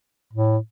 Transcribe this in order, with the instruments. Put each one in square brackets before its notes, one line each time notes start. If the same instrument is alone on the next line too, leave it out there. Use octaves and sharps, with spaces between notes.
[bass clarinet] A2